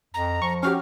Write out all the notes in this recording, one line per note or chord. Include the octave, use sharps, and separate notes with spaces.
F2 A#5
F3 C#6
C#4 F#4 G4 F6